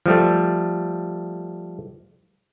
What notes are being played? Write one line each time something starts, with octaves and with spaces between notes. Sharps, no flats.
F3 G3 A3